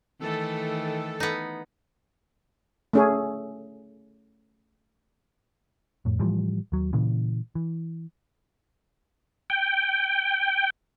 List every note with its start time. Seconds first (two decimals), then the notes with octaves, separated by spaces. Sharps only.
0.20 D#3 E3 A3 A4
1.20 B3 D#4
2.93 A3 C#4 G#4
6.05 F2 A2
6.19 A2 E3 F3 G3
6.72 D#2 F#3
6.93 A#2 C#3 E3
7.55 E3
9.50 G5